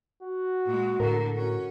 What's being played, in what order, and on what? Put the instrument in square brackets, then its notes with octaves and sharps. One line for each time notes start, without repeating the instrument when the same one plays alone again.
[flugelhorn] F#4
[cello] A#2 G#3
[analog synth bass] A2 [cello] D3 [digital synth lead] A#4
[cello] C#4 [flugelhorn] F#4